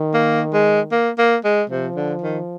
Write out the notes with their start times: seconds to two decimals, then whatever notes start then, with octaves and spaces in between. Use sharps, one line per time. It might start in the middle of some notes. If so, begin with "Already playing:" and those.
Already playing: D#3
0.14 A#3
0.53 G#3
0.92 A#3
1.18 A#3
1.44 G#3
1.69 C3 F3
1.96 D3
2.21 D#3